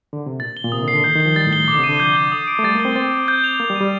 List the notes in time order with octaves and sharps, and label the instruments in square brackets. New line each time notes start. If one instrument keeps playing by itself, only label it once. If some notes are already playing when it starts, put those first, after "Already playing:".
[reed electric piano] D3
C3
[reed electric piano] A#2 [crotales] A6
[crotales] G7
[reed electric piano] A#2
[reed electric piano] C3 [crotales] D#6
[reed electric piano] D3
[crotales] C7
[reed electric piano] D3
[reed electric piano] D#3 [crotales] G6
[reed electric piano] D#3
[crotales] G7
[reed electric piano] F3
[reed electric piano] G3 [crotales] A6
[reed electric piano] A2
[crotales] G7
[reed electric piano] A#2 [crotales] D6
[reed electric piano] D3
C3
[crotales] D#7
[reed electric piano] D3
[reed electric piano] F3 [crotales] G6
[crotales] G7
D#6
D7
[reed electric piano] A3
[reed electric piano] G3 [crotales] A6
[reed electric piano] A#3
[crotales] G7
[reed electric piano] C4
[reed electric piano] C4 [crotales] A6
[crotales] D#7
G6
F7
[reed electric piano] A#3 [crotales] G6
[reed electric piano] G3
[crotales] D#7
[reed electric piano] G3